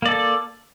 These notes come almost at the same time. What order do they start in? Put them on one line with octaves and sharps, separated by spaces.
A#3 D5 A4